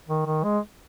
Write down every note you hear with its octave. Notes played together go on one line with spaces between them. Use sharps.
D#3
D#3
G#3